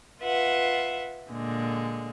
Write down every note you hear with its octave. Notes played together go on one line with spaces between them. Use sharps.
F4 B4 E5 F#5
A#2 D3 G#3